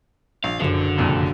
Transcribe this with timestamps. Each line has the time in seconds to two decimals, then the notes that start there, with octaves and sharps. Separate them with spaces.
0.44 A#1 F5
0.60 F#1 F#2 D3
0.98 C2 F2 A#2